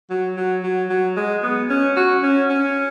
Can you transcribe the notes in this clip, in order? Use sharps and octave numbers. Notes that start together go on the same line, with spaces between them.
F#3
F#3
F#3
F#3
G#3
B3
C#4
F#4
C#4
C#4